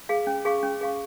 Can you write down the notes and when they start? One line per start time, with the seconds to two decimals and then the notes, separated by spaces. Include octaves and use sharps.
0.09 G#4 F5
0.27 C#4
0.45 G#4 F5 C#6
0.63 C#4
0.81 G#4 F5 C#6